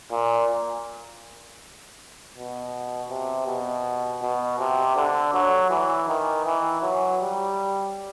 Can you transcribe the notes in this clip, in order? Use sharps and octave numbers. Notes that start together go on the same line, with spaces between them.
A#2
B2
C3
B2
B2
C3
D3
F#3
E3
D#3
E3
F#3
G3